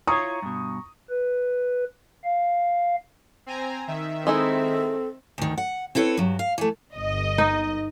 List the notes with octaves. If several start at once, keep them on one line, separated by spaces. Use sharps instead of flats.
E4 F4 C#5 A#5 C#6 D#6
G2 B2
B4
F5
C4 G#5 A#5
D#3 E5
G#3 C4 D#4 E4 A4
D2 D#3
F#5
C4 E4 A4 B4 C#5
G2 F#3
F5
E3 A3
G1 D#5
D#4